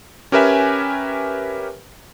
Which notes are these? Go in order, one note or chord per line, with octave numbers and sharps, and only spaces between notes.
C#4 G4 A#4 B4 E5 G#5